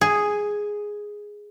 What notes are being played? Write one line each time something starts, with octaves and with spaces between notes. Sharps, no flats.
G#4